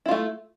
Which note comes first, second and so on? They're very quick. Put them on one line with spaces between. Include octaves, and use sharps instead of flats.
E4 F4 A3